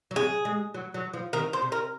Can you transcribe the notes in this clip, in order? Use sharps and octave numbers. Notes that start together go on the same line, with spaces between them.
F#3
G#3 G#4
G#3
F#3
F#3
F3
D#3 A#4
C5
C3
A#4